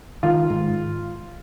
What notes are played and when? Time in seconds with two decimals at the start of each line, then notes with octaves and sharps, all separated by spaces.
0.23 D#3 F4
0.50 G#2